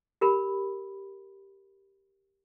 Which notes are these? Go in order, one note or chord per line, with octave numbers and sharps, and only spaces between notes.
G4 A#4 B5